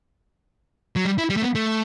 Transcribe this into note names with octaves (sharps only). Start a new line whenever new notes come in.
F#3
G3
E4
G3
A3
B3
A3